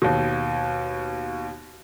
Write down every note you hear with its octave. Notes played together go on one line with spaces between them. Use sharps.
D#2 B2